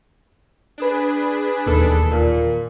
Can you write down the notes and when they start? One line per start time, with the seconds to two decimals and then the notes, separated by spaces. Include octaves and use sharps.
0.78 D4 G#4 B4
1.67 E1 D#2 D#3 A4
2.10 A#2